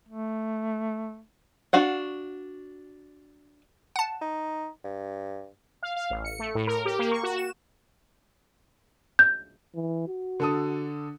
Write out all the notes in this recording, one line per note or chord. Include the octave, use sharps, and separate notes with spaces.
A3
D4 F#4 F5 F#5
F#5 A5
D#4
G2
F5
F5
A1
C#7
A3
A2
A#4
G4
A#3
C#6
F#4
E7
G6
E3
F#4
D3 A4 D#6